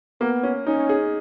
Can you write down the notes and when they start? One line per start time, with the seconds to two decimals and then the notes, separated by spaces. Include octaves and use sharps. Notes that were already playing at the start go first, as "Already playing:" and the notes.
0.21 A#3 B3
0.43 C#4
0.66 C#4 D#4
0.89 G#4